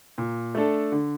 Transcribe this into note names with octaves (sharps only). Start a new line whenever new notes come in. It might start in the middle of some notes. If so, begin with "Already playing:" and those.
A#2
A3 D4 A4
D3